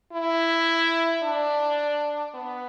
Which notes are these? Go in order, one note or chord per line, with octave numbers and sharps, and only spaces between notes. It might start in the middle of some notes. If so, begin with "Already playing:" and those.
E4
D4
B3